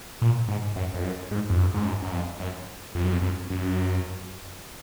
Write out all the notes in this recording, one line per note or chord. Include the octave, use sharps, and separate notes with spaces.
A#2
G#2
F#2
F2
F#2
G#2
F2
F#2
G#2
F#2
F#2
F2
F#2
F2
F#2
F2
F#2
F#2